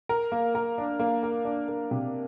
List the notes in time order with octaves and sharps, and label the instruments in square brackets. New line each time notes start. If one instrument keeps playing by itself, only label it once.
[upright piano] A#4
A#3
A#4
D4
A#3
A#4
D4
A#3
C3